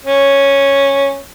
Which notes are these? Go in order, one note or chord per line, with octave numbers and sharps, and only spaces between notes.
C#4